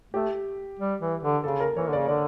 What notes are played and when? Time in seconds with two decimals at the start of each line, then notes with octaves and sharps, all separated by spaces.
0.14 A3 G4
0.79 G3
1.00 E3
1.23 D3
1.43 C#3 A4
1.60 A#4
1.76 E3 C#5
1.88 D3
1.93 C#3 D5
2.08 D3 D5